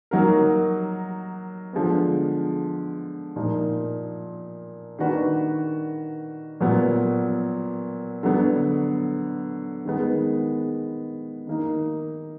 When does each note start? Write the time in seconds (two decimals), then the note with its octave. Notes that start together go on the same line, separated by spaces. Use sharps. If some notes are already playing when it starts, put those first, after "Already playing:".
0.11 F#3 A#3 D#4 F#4 A#4
1.73 D3 F3 G#3 B3
3.36 A#2 F3 A#3 D#4
4.98 D#3 A#3 D4 F#4 B4
6.60 A#2 F#3 B3
8.23 D3 F#3 B3
9.85 D#3 G#3 B3
11.47 D#3 A#3 D#4